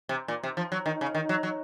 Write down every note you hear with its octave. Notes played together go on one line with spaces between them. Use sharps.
C3
A#2
C3
F3
F#3
D#3
C#3
D#3
F#3
F#3